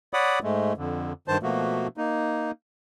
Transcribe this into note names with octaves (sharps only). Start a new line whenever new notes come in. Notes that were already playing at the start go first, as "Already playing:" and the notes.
C#5 D5 F#5 B5 D6 D#6
G#2 G#3 A3
F2 D3
G2 D#3 C5 A5
B2 F3 A3 A#3 F#4
A#3 D#4